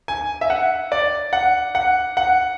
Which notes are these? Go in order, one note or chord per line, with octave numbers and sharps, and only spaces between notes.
G#5
E5
F#5
D5
F#5
F#5
F#5